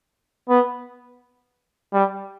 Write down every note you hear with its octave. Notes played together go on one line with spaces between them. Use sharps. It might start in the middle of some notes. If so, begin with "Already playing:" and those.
B3
G3